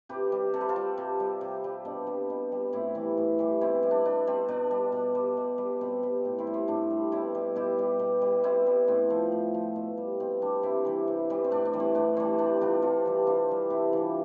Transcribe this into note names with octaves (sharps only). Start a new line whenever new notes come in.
C3 G4 B4
G3
C3 A4
B4
F4 A4
G3
C3
G3
C3
G3
B2 D4
G3
B2
G3
A2 C4 E4
E3 G3
A2
E3 G3
B2 C4 E4
G3
D4
B2 D4
G3 C4
B2 D4
G3
B2
G3
B2
G3
B2 C4
G3
A2
C4 E4
G3
C4
A2 D4
G3
B2 C4 E4
G3
B2 E4 G4
G3
B2
G3
B2 C4 E4
G3
A2 C4
F3
A2
F3
B2
G3
B2 C4
G3 D4
C3 C4 E4
E3 G3
C3
E3 G3
C4
A2 D4
D4
E3 G3
C4
A2 D4
E3 G3 C4
C3 D4
E3 G3 D4 F4
C3 F4 A4
E3 G3
C3 D4 F4
E3 G3
C3 C4 E4
E3 G3 D4 F4